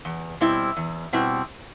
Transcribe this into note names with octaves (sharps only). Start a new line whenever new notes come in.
E2
B2 G3 C4 E4
E2
B2 G3 C4 E4